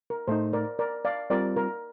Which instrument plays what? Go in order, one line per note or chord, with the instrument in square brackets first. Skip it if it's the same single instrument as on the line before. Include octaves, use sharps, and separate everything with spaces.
[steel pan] A#4
[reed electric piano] A2 A3 D#4 [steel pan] C5
[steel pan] A#4 D5
A#4 D5
D5 F5
[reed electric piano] G3 C4 F4 [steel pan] A#4 D5
[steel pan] A#4